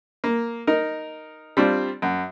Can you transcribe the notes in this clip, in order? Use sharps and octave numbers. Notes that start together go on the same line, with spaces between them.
A#3
D#4 A#4
G3 C4 D4 F4
F#2